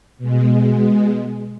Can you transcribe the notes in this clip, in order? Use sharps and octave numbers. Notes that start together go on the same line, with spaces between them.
B2 G#3